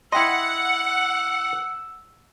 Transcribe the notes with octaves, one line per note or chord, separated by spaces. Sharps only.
E4 D#5 F#5 G5 C6 E6